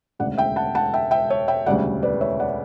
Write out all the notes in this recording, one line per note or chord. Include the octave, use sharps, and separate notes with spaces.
E1 D2 C#3 D5 F#5
E5 G5
F#5 A5
F#5 A5
E5 G5
E5 G5
C#5 E5
E5 G5
E1 D2 C#3 G3 D5 F#5
B4 D5
C#5 E5
D5 F#5